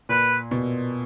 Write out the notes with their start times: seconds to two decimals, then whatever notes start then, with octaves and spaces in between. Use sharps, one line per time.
0.09 A#2 B4
0.51 B2